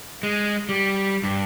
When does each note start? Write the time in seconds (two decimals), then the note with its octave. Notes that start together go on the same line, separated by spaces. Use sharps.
0.23 G#3
0.69 G3
1.24 G2